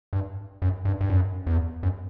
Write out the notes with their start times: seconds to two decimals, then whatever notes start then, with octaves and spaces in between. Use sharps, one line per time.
0.13 G2
0.62 F#2
0.85 G2
1.01 G2
1.10 F#2
1.47 E2
1.83 F#2